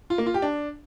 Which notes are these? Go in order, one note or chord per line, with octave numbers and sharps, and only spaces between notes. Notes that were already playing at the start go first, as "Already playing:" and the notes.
F4
A#3
F4
G4
D4